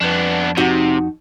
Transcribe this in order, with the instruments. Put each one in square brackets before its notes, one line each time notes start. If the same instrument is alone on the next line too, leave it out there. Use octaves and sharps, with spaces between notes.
[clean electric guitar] F2 [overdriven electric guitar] B3 D4
[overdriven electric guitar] C3 [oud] D#4 F#4